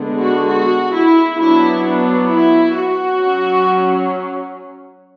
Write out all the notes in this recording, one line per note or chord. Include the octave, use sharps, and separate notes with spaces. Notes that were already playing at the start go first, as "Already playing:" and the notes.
Already playing: D3 G#3 B3
F#4
F#4
E4
F#3 B3 D4 E4
D4
E4
F#4
F#3 C#4